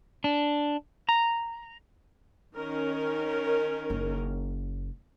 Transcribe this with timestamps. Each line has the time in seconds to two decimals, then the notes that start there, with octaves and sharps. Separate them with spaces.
0.24 D4
1.09 A#5
2.57 D#3 C#4 A#4
3.90 F#1